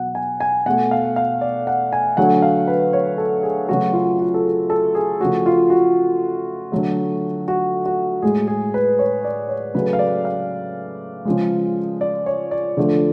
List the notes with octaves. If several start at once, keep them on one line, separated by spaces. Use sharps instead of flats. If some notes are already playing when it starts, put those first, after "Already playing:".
Already playing: B2 F#3 F#5
G#5
G#5
B2 A3 F#5
F5
F5
D5
F#5
G#5
D3 F#3 A3 F#5
F5
B4
C#5
A4
G#4
C#3 F#3 A3 F#4
F4
F#4
A4
G#4
A4
G#4
C#3 F3 A3 F#4
F4
F#4
D3 F#3 A3
F#4
F#4
A2 G#3 G#4
G#4
B4
C#5
D5
C#5
C#3 F#3 A3 B4
F5
D5
F5
C#3 F3 G#3
D5
C#5
D5
D3 F3 A3